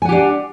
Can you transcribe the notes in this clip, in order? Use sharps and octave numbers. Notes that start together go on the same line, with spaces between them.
D4 G4 F#5 G#5